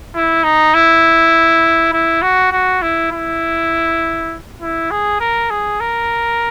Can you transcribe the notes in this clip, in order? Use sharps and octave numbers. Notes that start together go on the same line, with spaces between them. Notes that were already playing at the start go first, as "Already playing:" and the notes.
E4
D#4
E4
E4
F#4
F#4
E4
E4
E4
G#4
A#4
G#4
A#4